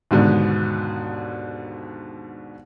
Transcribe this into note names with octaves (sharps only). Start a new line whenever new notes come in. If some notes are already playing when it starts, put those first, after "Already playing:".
D#2 G#2 B2 D3